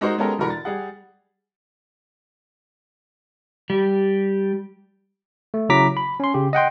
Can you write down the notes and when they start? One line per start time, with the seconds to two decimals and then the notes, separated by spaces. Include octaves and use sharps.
0.01 G#3 D#4 F#4 A#4 C5
0.18 G#3 B3 C#4 G4 A4 A#4
0.38 E1 D3 E3 F#4 A#4 B5
0.50 A6
0.65 G3 G#4 F#5
3.70 G3
5.54 A3
5.69 C#3 F#3 E4 A#5 D6 B6
5.97 B5
6.20 C#4 C6
6.34 C#3 G4
6.53 D#5 F#5 G5 C6